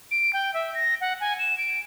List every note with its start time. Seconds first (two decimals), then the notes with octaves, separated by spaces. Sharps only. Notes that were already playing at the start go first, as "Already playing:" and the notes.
0.11 D7
0.33 G5
0.54 E5
0.74 A#6
1.01 F#5
1.21 G#5
1.39 E7
1.58 D7